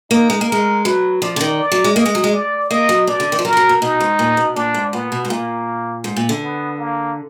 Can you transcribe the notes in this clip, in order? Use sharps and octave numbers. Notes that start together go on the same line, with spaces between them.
A#3 D#4
G#3
A#3
G#3 A#4
F#3 B4
F3 D5
D3
D#3
D5
F#3
G#3
A#3 D#5
G#3
F#3
G#3
D5
A#3 D#5
F#3
B2 D5
D3
D#3
F3
F#3 A#4
F3
F#3
B2
B2 D#4
G#2
A#2
B2
A#2 D4
G#2
A#2 B3
B2
G#2
A#2 A#3
G#2
A#2
D3
B3
A#3